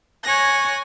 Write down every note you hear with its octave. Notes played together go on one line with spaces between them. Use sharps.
C#5 G#5 F#6 A#6